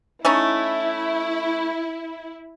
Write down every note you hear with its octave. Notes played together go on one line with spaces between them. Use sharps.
A3 C#4 D#4 E4